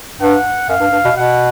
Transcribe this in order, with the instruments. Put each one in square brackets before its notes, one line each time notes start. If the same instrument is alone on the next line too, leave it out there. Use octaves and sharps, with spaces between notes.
[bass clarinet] G2 [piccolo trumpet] F#5
[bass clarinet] F#2 [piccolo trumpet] F5
[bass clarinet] G2
G2
B2
[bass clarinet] B2 [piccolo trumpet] F#5